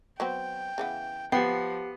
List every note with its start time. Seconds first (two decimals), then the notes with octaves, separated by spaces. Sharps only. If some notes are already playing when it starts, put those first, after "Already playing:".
0.20 F#3 B3 C4 G5
0.78 C#3 E3 B3
1.32 F3 B3 G4 F#5 G5 C7